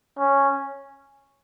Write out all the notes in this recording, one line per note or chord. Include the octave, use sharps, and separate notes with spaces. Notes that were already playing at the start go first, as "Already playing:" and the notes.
C#4